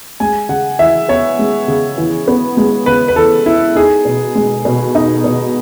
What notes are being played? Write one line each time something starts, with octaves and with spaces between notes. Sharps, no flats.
G#3 G#5
C#3 F#5
E3 E5
B3 C#5
G#3
C#3
E3
B3
G#3
C#3 B4
B4
E3 A4
B3 E4
D#4 G#4
B2
G#3
B2
D#4
B2